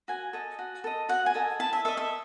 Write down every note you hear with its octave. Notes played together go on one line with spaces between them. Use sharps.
F#4 G#5
A4 D#5
F#4
A4 D#5
F#4 F#5
G#5
A4 D#5
E4 A5
E5
A4 D#5 E5
E5